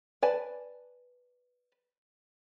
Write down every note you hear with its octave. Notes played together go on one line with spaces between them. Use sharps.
B4 D5 G#5 A5